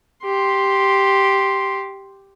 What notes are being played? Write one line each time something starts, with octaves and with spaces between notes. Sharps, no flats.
G4 C6